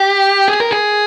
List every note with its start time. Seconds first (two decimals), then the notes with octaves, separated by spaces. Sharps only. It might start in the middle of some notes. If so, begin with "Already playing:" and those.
Already playing: G4
0.48 G#4
0.60 A#4
0.71 G#4